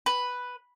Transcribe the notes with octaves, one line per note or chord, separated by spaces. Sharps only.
B4